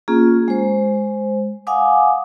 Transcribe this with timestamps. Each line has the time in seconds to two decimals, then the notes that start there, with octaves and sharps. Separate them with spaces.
0.08 A#3 C#4 F4 G#4
0.48 G#3 C5
1.67 F5 F#5 G#5 D6 D#6